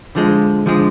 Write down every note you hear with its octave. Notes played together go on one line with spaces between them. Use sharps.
D3 F3 G#3
D3 F3 G#3